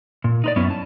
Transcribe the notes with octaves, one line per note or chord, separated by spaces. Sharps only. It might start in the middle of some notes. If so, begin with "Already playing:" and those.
A#2
D#4 B4 D5
F#2 B3 C#4 E4
A5